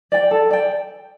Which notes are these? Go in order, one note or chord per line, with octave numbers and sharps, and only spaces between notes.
D5 G5
A4
D5 G5